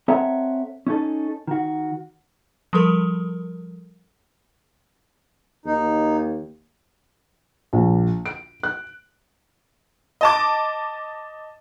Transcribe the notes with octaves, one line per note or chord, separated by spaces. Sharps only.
C4 A4 C#5 E5 F#5 A#5
C#4 D#4 A4
D#3 F#4
F3 G3 A4 A#4
D#2 D#4
A#1
D7
F#6
D#5 A5 D6